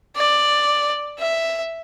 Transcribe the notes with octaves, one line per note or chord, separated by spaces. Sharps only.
D5
E5